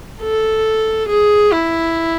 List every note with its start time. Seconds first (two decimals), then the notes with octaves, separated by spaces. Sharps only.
0.22 A4
1.09 G#4
1.52 E4